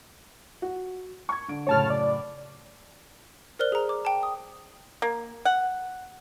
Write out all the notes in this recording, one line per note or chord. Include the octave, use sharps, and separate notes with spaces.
F#4
C#6 G#6
D3 D7
F#2 A2 C#3 C#5 A5 F6
D5
A#4 C5 D5 F6 F#6 G7
G#4 A#5
D6
G5 A5
D#6
A#3
F#5